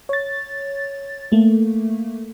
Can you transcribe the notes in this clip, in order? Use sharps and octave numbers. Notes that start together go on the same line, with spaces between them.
C#5 A6
A3 A#3